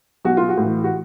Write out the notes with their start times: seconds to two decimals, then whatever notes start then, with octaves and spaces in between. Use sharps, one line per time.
0.25 B1 F#4
0.37 F4
0.49 F#4
0.57 A2
0.63 E3
0.84 F#4